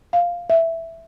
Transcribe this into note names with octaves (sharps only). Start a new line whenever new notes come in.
F5
E5